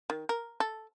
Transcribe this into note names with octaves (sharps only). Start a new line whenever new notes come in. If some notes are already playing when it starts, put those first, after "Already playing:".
D#3
A#4
A4